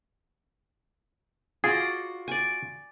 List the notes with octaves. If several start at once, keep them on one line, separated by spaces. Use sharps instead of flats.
F4 F#4 G#4 D5
D5 G#5